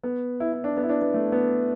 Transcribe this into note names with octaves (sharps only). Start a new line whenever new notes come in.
B3
E4
E4
D4
B3
E4
D4
B3
A3
B3